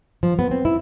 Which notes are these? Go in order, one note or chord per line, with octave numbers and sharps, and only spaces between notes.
F3
B3
C4
E4